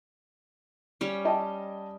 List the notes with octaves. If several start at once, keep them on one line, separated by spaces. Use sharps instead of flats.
G3 C#4
D#5 G5 A5